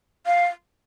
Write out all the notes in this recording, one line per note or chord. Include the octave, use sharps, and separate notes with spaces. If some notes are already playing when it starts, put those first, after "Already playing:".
F5